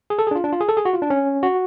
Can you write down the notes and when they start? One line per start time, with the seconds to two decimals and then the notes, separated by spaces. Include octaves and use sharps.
0.10 G#4
0.19 A4
0.27 G#4
0.31 D4
0.35 F4
0.44 D4
0.52 F4
0.60 G#4
0.69 A4
0.77 G#4
0.85 F#4
0.93 F4
1.02 D4
1.10 C#4
1.43 F#4